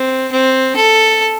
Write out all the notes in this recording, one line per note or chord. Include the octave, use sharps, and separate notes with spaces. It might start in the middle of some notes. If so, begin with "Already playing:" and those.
Already playing: C4
C4
A4